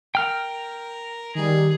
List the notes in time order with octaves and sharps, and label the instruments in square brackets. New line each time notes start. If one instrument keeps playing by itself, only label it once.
[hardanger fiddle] A#4 [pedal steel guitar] G5 F6
[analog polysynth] D#3 G3 [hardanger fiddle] G#4